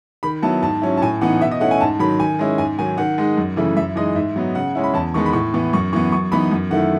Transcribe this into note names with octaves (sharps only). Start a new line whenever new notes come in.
D#3 B5
F#3 B3 E4 A5
G#2 A5
F#3 C#4 E4
A5
A2 G#5
E3 B3 D#4 F#5
B2 E5
D#5
A3 C#4 E4 F#5
G#5
G#2 A5
D#3 F#3 B5
D#3 G#5
G#3 C#4 E4
G#2 G#5
D#3 F#3 G#5
D#3 F#5
G#3 D#4
F#2
C#3 E3 A3 E4
F#2 E5
E3 G#3 D#4 D#5
G#2 E5
F#3 B3 D#4
C#3 F#5
G#3 C#4 E4
B5
E2 A5
D#3 G#3 B3 C#6
B5
A2 C#6
E3 B3
F#2 C#6
E3 B3 C#6
F#2 C#6
E3 B3 D#4 B5
F#2
D#3 A3 E4 F#5